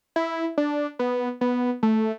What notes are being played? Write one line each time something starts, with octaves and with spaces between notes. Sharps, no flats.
E4
D4
B3
B3
A3